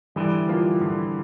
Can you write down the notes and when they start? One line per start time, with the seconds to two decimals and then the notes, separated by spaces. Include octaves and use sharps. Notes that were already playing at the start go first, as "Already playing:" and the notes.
0.16 D3 E3 G3
0.49 F3 A#3 F4
0.81 D3